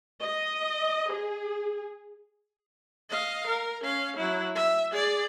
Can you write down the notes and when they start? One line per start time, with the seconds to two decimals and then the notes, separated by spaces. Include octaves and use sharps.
0.21 D#5
1.12 G#4
3.10 D#5 F5
3.47 A#4
3.84 C#4 F5
4.17 F#3 E4
4.55 E5
4.92 G#4 D5